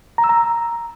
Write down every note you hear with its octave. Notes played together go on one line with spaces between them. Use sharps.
A#5
E6
A#5